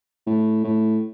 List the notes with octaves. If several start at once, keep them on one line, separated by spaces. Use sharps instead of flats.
A2
A2